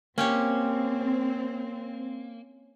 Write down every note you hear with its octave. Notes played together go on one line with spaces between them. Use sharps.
A#3 C4 C#4 G4 C#5